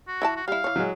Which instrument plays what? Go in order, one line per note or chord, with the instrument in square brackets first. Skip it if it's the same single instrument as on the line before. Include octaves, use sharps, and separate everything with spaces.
[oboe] F#4
[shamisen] E3 E4 A5
[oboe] F#4
[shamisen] G3 E4 [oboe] F5
[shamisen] E3 C#5
[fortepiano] F#3 G#3